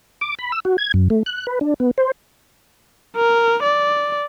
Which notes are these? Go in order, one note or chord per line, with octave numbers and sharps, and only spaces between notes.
D6
B5
E6
F#4
G#6
F#2
A3
F#6
B4
D4
B3
C5
A#4
D5